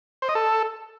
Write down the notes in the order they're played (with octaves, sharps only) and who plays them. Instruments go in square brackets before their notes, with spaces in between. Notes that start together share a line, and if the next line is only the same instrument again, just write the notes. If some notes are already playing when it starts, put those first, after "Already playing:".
[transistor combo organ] C5
D#5
A4